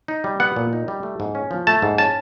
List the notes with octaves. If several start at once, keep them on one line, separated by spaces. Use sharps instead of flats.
D#4
G3
B3 F#5
A#2
D#4
G3
A3
G#2
C#4
F3
A3 A5
G#2
C#4 A5